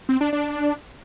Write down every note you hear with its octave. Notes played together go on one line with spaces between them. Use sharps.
C4
D4
D4